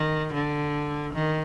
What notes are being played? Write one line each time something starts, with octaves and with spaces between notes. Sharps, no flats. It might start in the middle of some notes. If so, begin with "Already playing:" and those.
Already playing: D#3
D3
D#3